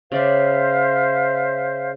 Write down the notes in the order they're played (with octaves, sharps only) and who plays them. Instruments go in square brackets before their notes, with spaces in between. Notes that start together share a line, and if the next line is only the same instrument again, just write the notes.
[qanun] C#3 D5 D6 [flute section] C5 E5 F5